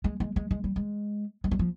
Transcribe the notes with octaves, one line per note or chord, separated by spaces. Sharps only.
G#3
G#3
G#3
G#3
G3
G#3
G#3
G3
F3